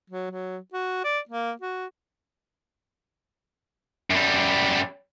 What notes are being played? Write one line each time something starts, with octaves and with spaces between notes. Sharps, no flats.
F#3
F#3
F#4
D5
A#3
F#4
F#2 G3